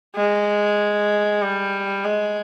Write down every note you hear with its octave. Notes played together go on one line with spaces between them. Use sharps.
G#3
G3
G#3